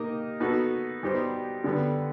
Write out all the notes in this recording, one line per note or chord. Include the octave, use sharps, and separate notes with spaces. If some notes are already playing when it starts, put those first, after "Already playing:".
Already playing: A#3 D#4 G4 A#4 D#5
B3 D#4 F#4 A4
G3 B3 D#4 G4 C5
D3 G3 B3